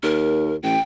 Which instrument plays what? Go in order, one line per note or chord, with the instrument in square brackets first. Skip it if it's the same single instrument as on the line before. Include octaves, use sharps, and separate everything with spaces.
[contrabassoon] D#2 [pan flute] A#4
[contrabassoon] A1 [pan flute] G5